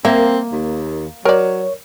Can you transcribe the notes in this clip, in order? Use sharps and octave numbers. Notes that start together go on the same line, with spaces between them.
A#3 C4 E5
D#2
F#3 A#4 C#5 D5